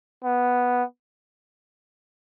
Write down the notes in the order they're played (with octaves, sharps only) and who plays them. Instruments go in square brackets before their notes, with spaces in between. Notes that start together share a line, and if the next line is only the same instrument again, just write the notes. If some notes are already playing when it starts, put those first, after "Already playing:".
[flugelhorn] B3